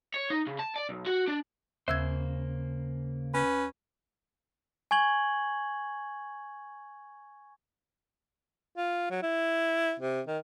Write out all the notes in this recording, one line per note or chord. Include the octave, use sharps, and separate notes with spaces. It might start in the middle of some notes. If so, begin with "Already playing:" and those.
C#5
D#4
C#3
A5
D5
B1
F#4
D4
D#2 C#3 A#3 C5 E6 G#6
C#4 B4
G#5 C#6 G#6 F#7 G7
F4
F#3
E4
C3
D#3